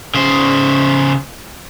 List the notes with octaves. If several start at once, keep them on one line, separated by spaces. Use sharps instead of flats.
C#3 C5